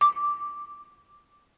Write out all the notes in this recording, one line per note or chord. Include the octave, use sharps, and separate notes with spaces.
D6